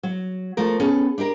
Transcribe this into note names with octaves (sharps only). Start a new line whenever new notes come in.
F#3
F3 A3 A#4
B3 C#4 G#4 A4
D4 E4 G4 A#4